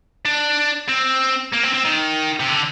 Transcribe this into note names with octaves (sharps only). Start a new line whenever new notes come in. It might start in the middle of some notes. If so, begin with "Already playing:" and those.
D4
C4
A#3
C4
C4
D#3
C3
D3